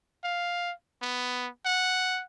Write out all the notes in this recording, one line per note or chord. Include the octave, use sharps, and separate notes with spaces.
F5
B3
F#5